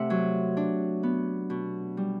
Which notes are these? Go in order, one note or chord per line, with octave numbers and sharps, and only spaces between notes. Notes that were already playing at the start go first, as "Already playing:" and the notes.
Already playing: C3 A3 D4 E5 F#5
F#3
D4
B3
B2
G3